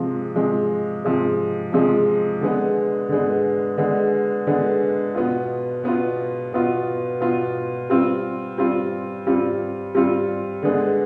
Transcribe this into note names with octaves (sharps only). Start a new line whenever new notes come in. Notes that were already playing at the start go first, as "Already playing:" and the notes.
Already playing: C3 F3 G#3
C3 F3 G#3
C3 F3 G#3
C3 F3 G#3
D3 G#3 B3
D3 G#3 B3
D3 G#3 B3
D3 G#3 B3
B2 B3 F4
B2 B3 F4
B2 B3 F4
B2 B3 F4
G3 C4 F4
G3 C4 F4
G3 C4 F4
G3 C4 F4
D3 G#3 B3